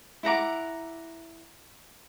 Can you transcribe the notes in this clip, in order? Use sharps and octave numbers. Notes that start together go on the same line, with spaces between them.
E4 F#5 A#5 D6